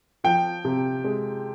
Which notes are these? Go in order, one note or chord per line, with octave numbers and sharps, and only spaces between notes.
F3 G5
C3
G#3